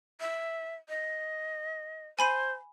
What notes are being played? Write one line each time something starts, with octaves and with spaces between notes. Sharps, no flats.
E5
D#5
C5 G#5 B5 D#7